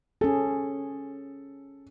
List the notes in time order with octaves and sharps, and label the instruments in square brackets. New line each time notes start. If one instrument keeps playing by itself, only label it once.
[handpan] C#4 G#4 [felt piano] A4